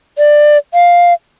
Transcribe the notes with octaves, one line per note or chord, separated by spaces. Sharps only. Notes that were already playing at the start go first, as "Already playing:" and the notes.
D5
F5